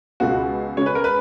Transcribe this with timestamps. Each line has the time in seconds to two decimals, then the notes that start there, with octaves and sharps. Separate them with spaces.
0.20 C#2 B2 G#3 B3 F4 F#4
0.77 C#3 G#3 C#4 C#5
0.86 B4
0.95 A#4
1.04 B4